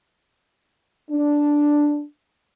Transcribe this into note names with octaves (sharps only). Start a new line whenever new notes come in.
D4